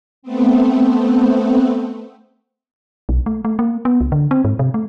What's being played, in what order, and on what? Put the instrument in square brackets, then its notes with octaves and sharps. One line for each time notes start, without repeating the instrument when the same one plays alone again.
[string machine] A3 B3 C4
[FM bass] B1
A3
A3
A#3
B3
C#2
D3
C4
G#2
C3
A3